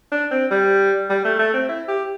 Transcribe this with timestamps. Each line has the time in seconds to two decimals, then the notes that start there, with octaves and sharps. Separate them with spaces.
0.12 D4
0.31 C4
0.51 G3
1.09 G3
1.25 A3
1.39 A3
1.54 C4
1.69 E4
1.88 G4